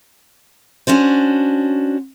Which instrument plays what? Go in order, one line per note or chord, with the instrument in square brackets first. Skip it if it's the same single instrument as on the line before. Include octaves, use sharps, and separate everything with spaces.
[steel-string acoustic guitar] C#4 D4 F#4 C5